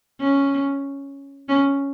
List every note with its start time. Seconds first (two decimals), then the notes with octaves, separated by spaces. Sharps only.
0.20 C#4
1.48 C#4